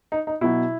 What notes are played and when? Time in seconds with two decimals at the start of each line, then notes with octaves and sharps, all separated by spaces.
0.12 D#4
0.27 D#4
0.41 B2 F#3 E4